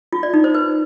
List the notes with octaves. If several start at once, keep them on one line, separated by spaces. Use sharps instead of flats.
F4
D5
D#4
C5
B4